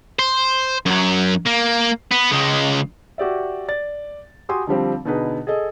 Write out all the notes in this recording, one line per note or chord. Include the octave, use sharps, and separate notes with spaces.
C5
F#2 F#3
A#3
B3
C#2 G#3
F#4 G4 D5 E5
D5 A6
F#4 G4 G#5 C6 D#6
D3 F3 G3 C4
B2 D3 D#4 G#4 B4
G#4 A4 D#5